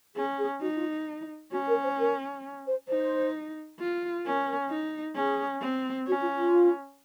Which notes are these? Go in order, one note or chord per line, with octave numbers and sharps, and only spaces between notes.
C#4 G#4
G#4
D#4 F#4
F4
C#4 F#4
A#4
C5
A#4
C5
D#4 C5
F4
C#4 A#4
D#4
C#4 G#4
C4
C#4 F#4
F4
F4